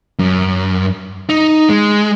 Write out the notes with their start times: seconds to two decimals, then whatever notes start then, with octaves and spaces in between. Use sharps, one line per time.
0.19 F#2
1.29 D#4
1.69 G#3